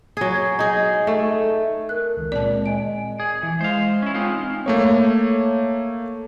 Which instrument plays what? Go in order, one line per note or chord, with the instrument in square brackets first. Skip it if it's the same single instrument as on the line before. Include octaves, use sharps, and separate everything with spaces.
[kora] F#3 G#4
D#4 G#4
A3
[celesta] A#4 F#6
[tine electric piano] C#2 D#3
[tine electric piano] A#2 G#3 C4 [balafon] D5 A5
[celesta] D#5 G#5 D7
[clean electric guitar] G#4
E3
[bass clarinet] G#3 [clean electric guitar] C5 F5
[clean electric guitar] C#4 E4
[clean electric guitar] G#3 D#4 F4 [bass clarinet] C4
[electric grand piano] A3 A#3 C#5